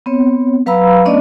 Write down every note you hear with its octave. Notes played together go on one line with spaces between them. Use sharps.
B3 C4 C#5
F#3 B4 F5 A#5 B5 E6
A3 B3 C#4 D4 D5 D#5